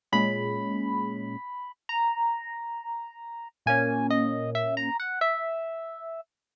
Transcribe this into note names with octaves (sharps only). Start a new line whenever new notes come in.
A#2 G#3 C#4 B5
A#5
A#2 A#3 C#4 G#5
D#5
E5
A#5
F#5
E5